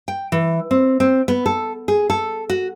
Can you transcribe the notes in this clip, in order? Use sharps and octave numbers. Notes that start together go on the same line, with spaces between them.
G5
E3
C4
C4
B3
A4
G#4
A4
F#4